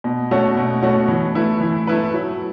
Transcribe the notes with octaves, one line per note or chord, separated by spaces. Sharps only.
B2
A3 C#4 F#4
B2
A3 C#4 F#4
E3
A3 E4 B4
E3
A3 E4 B4
F#3